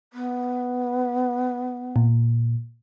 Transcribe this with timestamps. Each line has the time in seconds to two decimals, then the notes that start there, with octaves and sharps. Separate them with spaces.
0.13 B3
1.96 A#2